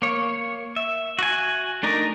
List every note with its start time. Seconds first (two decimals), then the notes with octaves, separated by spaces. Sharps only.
0.02 A#3 C#5
0.76 E5
1.19 F#4 G#5
1.83 A3 D4 D#4 A#4